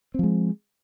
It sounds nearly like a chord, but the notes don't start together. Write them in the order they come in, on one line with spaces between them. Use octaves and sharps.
C4 F3 G#3